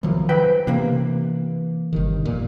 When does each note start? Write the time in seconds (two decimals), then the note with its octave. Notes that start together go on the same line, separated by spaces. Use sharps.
0.03 C2 D#3 F3 F#3
0.29 B4 C5 G5
0.67 C3 E3 A#3 D4
1.93 G1 C3 D#3
2.25 F2 A#2